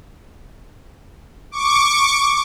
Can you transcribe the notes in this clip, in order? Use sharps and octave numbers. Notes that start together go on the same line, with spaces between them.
C#6 D6